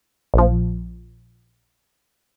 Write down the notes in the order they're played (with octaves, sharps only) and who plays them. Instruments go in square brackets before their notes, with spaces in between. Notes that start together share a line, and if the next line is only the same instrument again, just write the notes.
[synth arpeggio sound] A#1 F3